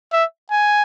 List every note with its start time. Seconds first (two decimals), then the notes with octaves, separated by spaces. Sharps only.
0.13 E5
0.51 G#5